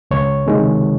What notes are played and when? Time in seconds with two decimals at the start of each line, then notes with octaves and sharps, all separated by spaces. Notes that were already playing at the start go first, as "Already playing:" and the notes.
0.11 C#2 C#5
0.46 C3 D#3 G#3